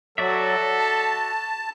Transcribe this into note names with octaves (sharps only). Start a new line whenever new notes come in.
F#3 F#4 A4 D5 E5
A5